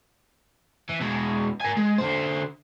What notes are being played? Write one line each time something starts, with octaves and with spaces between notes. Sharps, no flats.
E3
B2 G#3
A#4 G#5
G#3
D3 C5